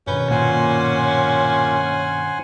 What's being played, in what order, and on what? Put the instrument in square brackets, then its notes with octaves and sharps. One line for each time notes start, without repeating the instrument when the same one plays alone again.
[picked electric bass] G2 B2 D#3 [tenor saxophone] C#4 [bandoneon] B4 G6
[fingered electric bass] A#2 [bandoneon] C5 F#5 G#5